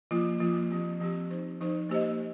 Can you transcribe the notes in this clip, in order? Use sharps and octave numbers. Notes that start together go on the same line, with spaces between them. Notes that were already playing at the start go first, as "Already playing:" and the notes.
F3 A#3 F4
F3 A#3 F4
F3 C4 G4
F3 C4 G4
F3 D#4 C5
F3 D#4 C5
A#3 G4 C5 D#5